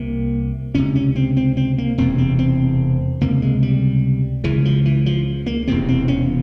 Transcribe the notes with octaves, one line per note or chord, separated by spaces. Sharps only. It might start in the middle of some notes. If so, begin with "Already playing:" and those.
Already playing: C2 C3 A#3
C#2 C3 C#4
C#4
C4
C4
C4
A#3
E1 E2 C3 C4
C4
C4
C#2 C3 A#3
G#3
G3
C#2 C#3 E3
F3
E3
F3
A#3
E1 E2 C3 C4
C4
C#4